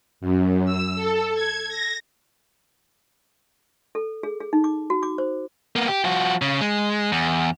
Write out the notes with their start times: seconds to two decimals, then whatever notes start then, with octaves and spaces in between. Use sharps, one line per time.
0.21 F#2
0.65 E6
0.96 A4
1.34 G#6
1.69 A#6
3.95 A4
4.23 G#4
4.40 G#4
4.53 D#4
4.64 D6
4.90 F#4
5.03 D6
5.18 C5
5.76 A#3 B3
5.88 G4
6.04 F3 F#4
6.42 C#3
6.61 G#3
7.12 E2